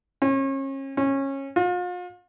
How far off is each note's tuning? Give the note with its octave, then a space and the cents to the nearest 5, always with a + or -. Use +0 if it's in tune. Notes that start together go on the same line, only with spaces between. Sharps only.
C#4 -35
C#4 -20
F4 +40